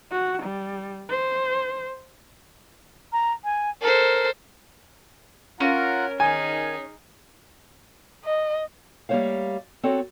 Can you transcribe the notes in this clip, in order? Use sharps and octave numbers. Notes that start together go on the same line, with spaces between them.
F#4
G3
C5
A#5
G#5
A4 A#4 C5
C#4 F4 A#4 F#5 A#5
D#3 D#4 G#4 G#5
D#5
G3 A3 A#3 C5 C#5 F5
C4 F#4 A4 C#5